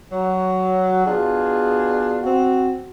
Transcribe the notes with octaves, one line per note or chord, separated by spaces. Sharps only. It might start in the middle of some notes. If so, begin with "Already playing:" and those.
F#3
B2 D4 F4 G#4
C4 F#4